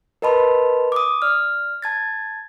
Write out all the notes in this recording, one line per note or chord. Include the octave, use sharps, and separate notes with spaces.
A#4 B4 D#5 A5 B5 C6
D6 D#6
D5 F6
A5 G#6 A6